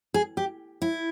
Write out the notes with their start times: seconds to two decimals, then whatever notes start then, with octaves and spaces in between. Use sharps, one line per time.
0.14 G#4
0.37 G4
0.82 E4